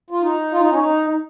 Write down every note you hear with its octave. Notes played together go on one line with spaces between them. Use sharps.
F4
D#4
F4
D#4
C#4
D#4